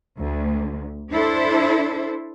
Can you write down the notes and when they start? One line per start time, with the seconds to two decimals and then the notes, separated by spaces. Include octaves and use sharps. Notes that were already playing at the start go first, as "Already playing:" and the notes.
0.18 D2
1.12 D4 E4 A4 C5